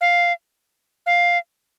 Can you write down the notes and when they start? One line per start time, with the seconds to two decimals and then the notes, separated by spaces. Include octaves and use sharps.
0.01 F5
1.06 F5